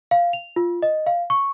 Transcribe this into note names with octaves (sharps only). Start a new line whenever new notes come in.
F5
F7
F4
D#5
F5
C#6